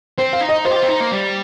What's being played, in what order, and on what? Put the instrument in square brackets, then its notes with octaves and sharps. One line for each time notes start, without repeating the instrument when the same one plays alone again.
[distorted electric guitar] C4 [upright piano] C5
[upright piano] F5
[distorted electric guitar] D#4
[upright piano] D#5
[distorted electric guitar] F4 [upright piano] C5
[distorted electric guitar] G4
F4
C4
D#4
A#3
G3